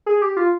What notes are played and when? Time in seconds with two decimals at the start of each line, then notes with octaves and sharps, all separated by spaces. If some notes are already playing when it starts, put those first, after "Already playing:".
0.06 G#4
0.22 G4
0.37 F4